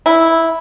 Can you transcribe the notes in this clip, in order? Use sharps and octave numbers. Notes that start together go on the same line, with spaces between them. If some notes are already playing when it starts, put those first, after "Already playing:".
E4